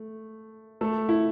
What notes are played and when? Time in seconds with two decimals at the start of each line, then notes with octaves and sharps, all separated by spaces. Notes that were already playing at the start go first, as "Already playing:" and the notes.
Already playing: A3
0.81 A3 A4
1.09 E4